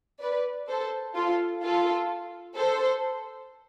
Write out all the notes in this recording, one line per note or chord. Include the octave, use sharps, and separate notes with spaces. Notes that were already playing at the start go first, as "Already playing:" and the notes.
B4 D5
A4 C5
F4 A4
F4 A4
A4 C5